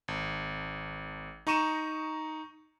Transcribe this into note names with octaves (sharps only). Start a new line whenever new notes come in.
G#1
D#4 A#5 C#6 D#7 E7